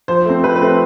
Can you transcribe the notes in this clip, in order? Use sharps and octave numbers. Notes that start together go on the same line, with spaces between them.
F3 C5
A3 C4
F3 B4
B4
A3 C4
B4